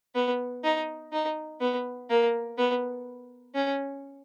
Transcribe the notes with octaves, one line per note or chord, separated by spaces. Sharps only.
B3
D#4
D#4
B3
A#3
B3
C#4